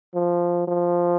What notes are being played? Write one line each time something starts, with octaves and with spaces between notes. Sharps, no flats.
F3
F3